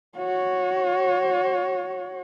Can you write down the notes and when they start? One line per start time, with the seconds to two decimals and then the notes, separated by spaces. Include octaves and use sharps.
0.17 F#4 C#5